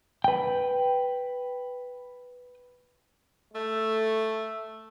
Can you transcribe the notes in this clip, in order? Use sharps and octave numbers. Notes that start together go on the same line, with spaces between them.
B4 G5
A3